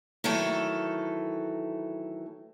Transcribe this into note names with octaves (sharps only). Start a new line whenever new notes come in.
D#3 E3 F#3 A3 A4